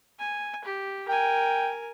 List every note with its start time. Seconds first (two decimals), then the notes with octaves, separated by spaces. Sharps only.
0.19 G#5
0.65 G4
1.08 A#4 G5 G#5